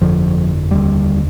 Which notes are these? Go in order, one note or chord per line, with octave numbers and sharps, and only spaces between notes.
G1 F2 D3 F3
F1 D#2 D3 G3